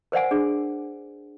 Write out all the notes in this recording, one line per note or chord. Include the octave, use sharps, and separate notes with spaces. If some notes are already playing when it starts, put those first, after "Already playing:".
A#4 C5 D5 F#5 G#5
D4 G#4